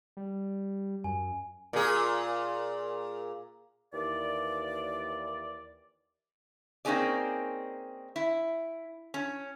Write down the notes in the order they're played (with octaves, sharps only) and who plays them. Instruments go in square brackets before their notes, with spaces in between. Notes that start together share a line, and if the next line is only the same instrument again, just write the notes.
[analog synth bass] G3
[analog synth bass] F#2 [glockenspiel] G#5
[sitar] A#2 G#4
[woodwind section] D#2 E3 D5
[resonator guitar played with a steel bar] A#3 C4 C#4 D#4 G#4 D5
E4
C#4